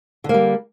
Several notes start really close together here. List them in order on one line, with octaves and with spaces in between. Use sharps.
D3 A#3 G3